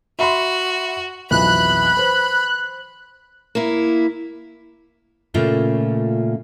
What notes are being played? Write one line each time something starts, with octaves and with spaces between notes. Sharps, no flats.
F#4 E5 B5 C6
B1 F2 E3 B5 F#6
B4 C5
A#3 E4
A#2 C#3 A3 C#4 F4 E5